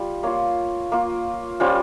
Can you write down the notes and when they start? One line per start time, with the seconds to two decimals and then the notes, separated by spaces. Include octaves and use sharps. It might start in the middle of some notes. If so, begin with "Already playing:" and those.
Already playing: G3 F4
0.23 A#3 F4 C#5
0.92 A#3 F4
1.60 G3 C#4 F4 C5